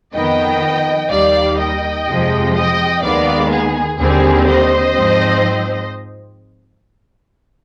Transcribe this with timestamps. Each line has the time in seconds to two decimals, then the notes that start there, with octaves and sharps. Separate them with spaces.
0.14 F2 D#3 B3 D#5 G5
1.10 D#2 D#3 G3 D5 F5
1.58 D#5 G5
2.07 F2 C3 F3 G#3
2.54 D#5 G5
3.02 D#2 D#3 G#3 B3 D5 F5
3.50 G#4
3.98 D#2 D3 G3 C4 G#4
4.45 C5 D#5
4.94 G#2 F3 C4